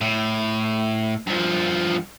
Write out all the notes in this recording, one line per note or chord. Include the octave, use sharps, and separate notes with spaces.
A2
G2 F3